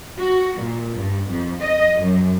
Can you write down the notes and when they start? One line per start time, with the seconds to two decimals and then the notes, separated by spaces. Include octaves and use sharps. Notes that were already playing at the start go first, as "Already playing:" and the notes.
0.18 F#4
0.58 A#2
0.96 G2
1.30 F2
1.61 D#5
2.00 F#2